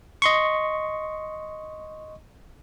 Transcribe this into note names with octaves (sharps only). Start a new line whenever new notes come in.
D#5 C6 C#6